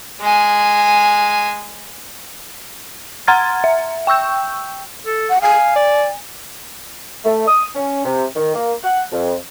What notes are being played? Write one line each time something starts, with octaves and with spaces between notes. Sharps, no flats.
G#3 G#5
F#5 A#5 C6 F6 G#6 A6
E5
G5 C#6 E6 G6
A4
F#5
F5 G#5
D5
A3
D#6
C#4
C3
D#3
A#3
F#5
F2